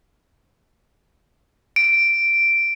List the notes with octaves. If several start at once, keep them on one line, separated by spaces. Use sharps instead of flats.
D7